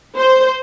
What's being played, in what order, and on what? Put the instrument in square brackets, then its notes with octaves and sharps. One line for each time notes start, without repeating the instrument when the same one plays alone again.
[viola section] C5